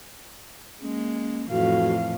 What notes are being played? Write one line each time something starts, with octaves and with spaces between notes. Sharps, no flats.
G#3 A#3 C#4
F2 A2 E3 F#4 F5